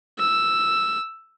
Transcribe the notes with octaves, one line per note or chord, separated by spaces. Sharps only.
E6